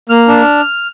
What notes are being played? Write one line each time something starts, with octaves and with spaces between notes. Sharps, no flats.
A#3 F6
D4